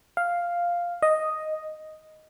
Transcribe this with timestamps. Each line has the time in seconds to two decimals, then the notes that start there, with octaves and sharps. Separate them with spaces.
0.17 F5
1.03 D#5